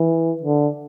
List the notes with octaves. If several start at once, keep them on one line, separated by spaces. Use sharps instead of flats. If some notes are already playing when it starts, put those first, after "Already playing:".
Already playing: E3
D3